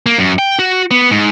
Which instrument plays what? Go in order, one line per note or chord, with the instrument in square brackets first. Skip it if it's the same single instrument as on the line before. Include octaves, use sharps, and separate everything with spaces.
[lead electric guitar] A#3
F#2
G5
F#4
B3
G#2